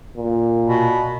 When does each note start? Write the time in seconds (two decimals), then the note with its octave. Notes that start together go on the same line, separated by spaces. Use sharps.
0.17 A#2
0.68 B2